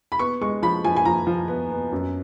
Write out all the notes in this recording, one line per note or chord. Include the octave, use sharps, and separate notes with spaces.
B5
B3 C#6
G#3 C#6
F3 B5
F3 G#5
G#5
F3 A#5
F3
B3
B3
F#2